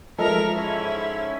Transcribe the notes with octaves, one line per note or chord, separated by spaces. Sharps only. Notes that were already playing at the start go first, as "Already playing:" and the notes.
F3 G#3 A4 A#4 E5 A#5 F7
G#2 C#4 E4 E5